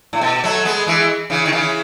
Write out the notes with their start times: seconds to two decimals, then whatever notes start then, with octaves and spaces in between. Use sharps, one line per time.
0.13 A2
0.21 B2
0.44 F#3 A3
0.65 G#3 B3
0.86 E3 G#3
1.30 C#3 E3
1.46 D#3
1.52 C#3 E3